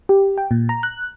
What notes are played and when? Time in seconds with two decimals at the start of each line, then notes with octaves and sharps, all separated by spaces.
0.09 G4
0.38 G5
0.51 A#2
0.69 A#5
0.83 F#6